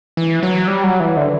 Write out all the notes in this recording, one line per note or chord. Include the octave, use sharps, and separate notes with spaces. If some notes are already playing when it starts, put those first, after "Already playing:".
E3
F#3
G3
F#3
E3
D3